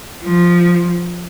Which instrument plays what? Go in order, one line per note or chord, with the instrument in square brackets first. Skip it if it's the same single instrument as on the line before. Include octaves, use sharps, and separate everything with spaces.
[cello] F3